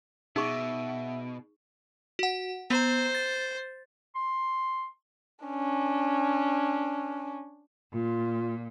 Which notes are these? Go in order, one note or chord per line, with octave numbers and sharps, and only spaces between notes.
B2 D#4 G#4 E5 C#6
F#4 F#5
B3 C5 A#5
A6
C6
C#4 D4
A#2 F4